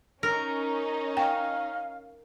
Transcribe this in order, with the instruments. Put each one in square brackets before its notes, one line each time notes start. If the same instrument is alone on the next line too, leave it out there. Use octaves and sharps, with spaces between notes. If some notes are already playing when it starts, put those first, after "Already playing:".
[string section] C#4 D#4 [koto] A#4
[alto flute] F5 [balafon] G5